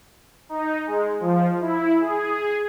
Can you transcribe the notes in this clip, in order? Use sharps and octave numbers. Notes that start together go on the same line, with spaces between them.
D#4
G#3
F3
E4
G#4